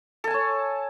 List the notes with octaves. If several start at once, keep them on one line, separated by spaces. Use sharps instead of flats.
A4 C#5 G#5 A5